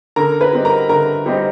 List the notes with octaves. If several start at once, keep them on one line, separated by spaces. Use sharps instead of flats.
D3 A#4 A#5
B4 B5
G3 C4 D#4
A#4 A#5
D3 A#4 A#5
G3 C4 D#4